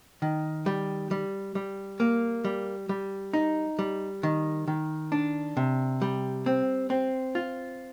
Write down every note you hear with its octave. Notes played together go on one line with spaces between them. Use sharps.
D#3
G3
G3
G3
A#3
G3
G3
D#4
G3
D#3
D#3
D4
C3
G3
C4
C4
F4